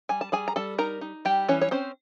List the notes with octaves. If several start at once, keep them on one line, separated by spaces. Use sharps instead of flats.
G3 G#5
A5
G3 G#4 G#5
A#5
G3 A4 A5
D#4 A#4 A#5
D#4
G3 G4 G5
E3 C#4 C#5
C#5
C4 C#4 C5